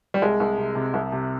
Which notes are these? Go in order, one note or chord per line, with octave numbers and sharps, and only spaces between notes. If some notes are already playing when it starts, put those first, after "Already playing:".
G3
C2 G#3
C2
C3
C3
C2
C3